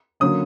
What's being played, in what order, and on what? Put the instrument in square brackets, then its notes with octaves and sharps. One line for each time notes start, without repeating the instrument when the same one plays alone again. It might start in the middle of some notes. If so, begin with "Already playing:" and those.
[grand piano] D3 F#3 A#3 C#4 D#6